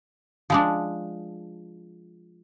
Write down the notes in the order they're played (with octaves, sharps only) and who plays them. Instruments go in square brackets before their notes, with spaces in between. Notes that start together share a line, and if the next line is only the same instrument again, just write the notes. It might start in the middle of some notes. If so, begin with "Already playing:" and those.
[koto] F3 G#3 D4